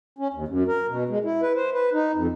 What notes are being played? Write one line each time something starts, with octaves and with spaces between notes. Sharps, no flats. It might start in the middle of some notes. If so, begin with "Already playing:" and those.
C#4
D#2
F#2
A#4
B2
G#3
E4
B4
C5
B4
D#4
F2